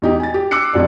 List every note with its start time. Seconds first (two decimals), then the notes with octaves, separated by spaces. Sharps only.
0.02 E2 D#4 G4
0.20 G#5 A6
0.34 G4
0.51 D6 E6 F#6 C7 C#7
0.73 G1 F2 G3 D5